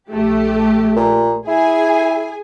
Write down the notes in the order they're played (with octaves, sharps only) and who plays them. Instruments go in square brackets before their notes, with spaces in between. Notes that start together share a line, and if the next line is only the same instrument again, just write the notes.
[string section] A#1 A3 G4
[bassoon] A#2
[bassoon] E4 [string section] G#4 G#5